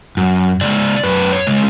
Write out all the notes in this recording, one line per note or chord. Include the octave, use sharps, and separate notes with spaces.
F#2
C#3 G#3 D5
F#2 B4
C#5
C#3 G#3